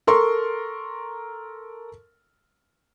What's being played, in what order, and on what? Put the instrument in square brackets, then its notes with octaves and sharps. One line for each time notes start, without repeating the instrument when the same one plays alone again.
[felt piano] A4 A#4 C6 C#6